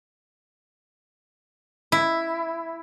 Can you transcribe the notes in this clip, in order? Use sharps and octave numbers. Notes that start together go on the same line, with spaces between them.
E4